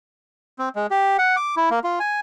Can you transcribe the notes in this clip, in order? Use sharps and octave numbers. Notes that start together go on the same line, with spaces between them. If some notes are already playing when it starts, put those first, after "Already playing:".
C4
G#3
G4
F#5
D6
E4
A#3
F4
G#5